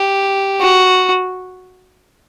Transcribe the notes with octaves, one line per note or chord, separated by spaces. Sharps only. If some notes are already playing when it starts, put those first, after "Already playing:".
Already playing: G4
F#4